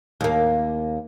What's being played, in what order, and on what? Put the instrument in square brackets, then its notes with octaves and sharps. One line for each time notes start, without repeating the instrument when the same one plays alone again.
[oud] D#2 A#3